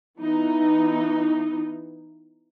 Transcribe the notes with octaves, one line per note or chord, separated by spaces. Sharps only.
E3 B3 D#4